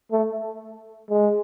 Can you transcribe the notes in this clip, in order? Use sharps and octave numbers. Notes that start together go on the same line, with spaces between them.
A3
G#3